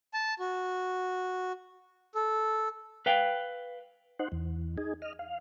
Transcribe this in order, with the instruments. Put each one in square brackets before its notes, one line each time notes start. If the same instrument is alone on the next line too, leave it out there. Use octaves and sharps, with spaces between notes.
[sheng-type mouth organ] A5
F#4
A4
[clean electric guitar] B4 F5 G5
[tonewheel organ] D#4 C5 F#5
E2
D#4 G#4
D#5 F6
F5